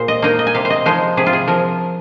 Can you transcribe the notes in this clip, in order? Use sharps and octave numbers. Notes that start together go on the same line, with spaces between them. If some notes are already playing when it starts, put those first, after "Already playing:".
Already playing: A#2 G#4 C5
D#5
A#3 D#4 D#5
D#5
G#5
C3 F5
C5
D#5
F3 G#3 D#4 C5
C3 G#4
F4
G#4
F3 A#4